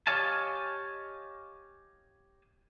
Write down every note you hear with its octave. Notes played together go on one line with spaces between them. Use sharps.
G4 C#5 D#5 F5 G#5 A5